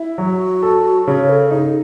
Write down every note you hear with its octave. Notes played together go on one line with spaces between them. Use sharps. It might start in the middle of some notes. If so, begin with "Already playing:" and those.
Already playing: E4
F#3 F#4
A4
C#3 C#5
A4
D#4 G#4